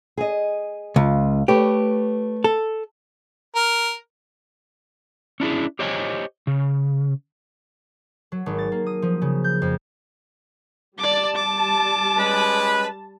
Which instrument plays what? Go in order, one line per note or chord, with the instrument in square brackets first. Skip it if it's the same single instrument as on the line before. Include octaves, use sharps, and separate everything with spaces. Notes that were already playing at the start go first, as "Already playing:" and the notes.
[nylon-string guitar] G#4 D#5
[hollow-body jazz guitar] C#2 [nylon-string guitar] F4
[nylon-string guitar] A3 B4 C#5 [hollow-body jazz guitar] G4
[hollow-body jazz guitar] A4
[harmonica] A#4
[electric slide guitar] C#4 D4 E4 G#4
G4 C5 C#5 D#5 G5 G#5
C#3
[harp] F#3
G#1
A6
A#3
D#6
F3
C#3
G6
F2
[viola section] G3 A5 [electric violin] D5 D6
[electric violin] D6
[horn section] G#3 C#4 B4